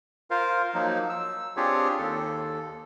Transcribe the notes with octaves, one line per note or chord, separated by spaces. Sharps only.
F4 A#4 C5 F5
F3 F#3 A#3 D#4
E6
C4 D4 F4 G4 G#4 C#5
D#2 A4